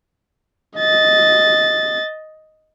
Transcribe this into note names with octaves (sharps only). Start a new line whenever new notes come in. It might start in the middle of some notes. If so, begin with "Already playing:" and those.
D#5 A6